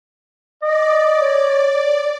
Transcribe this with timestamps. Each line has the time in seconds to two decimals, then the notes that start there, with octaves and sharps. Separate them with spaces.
0.62 D5 D#5
1.21 C#5